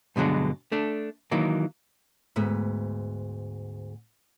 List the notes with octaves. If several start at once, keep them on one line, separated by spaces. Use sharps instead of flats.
G2 B2 D3 F#3 G#3
A3 D4
D#3 E3 F#3 A#3
D2 G#2 B3